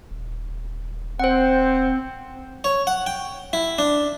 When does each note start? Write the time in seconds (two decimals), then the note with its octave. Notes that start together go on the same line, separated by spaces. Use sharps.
0.11 D#1
1.20 C4 C5 F#5
2.64 C#5
2.87 F#5
3.07 G5
3.53 E4
3.78 D4